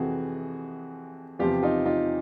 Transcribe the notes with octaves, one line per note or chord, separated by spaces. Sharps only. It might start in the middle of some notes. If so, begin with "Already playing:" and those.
Already playing: F2 C3 E3 F#4 G#4
E2 C3 F3 F4 G4
D#4 F4
D#4 F4